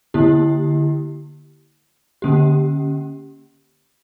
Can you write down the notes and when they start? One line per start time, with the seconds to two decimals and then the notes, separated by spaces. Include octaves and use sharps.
0.14 D3 A#3 E4 G4
2.22 D3 A#3 C#4 G4